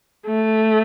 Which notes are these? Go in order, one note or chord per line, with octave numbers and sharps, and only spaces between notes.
A3